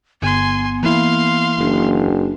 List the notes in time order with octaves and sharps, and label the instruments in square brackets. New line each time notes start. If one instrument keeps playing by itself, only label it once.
[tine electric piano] G1 [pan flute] B3 [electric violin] G#5 C6
[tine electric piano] E3 A#3 E4 [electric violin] F5 C6
[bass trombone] F#1 [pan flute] D4